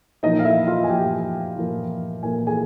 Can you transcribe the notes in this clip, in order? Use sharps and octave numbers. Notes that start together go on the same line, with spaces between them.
A#2 F3 A#3 D#4 D#5
F5
E4 E5
F4 F5
G#5
A#2 F3 A#3 G4 G5
A#2 F3 A#3
A#2 F3 A#3 G#5
G#4 G#5